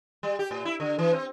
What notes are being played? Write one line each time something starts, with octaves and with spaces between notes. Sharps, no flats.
G3
G4
A2
E4
D3
E3
C4